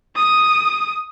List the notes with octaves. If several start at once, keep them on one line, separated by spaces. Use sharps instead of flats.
D#6